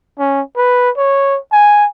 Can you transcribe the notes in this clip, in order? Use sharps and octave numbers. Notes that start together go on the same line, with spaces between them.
C#4
B4
C#5
G#5